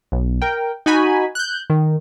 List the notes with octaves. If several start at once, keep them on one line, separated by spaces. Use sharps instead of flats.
B1
A#4 G5
D#4 F#4 G#5 B5
F#6 G6
D#3